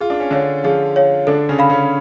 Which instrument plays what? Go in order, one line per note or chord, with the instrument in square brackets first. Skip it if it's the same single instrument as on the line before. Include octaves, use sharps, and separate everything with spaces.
[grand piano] F4 [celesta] G#4
[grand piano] D4
C#4
[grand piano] D3 D4 [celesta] C#5 F5
[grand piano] F3 F4 [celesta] G#4
[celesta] C#5 F5
[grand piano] D3 D4 [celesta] A4
[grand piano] C#3 C#4
[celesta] F5 B5
[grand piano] C#3 C#4